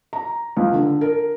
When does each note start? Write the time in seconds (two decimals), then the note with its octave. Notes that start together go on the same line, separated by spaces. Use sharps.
0.13 A#5
0.56 C#2
0.74 D3
1.01 A#4